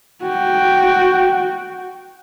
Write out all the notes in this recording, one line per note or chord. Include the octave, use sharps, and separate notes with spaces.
F#4 G5